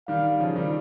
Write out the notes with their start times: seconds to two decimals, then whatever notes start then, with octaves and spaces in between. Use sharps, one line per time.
0.08 D#3 G3 F5
0.40 C#3 F3
0.56 D#3 G3